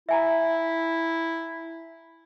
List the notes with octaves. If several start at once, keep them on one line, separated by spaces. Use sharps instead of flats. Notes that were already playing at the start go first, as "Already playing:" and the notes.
E4 E5 G#5 A#5